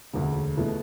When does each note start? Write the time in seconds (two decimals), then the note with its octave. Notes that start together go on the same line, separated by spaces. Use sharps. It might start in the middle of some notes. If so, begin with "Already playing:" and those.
0.14 E1 D2 D3
0.57 B2 A3 E4 B4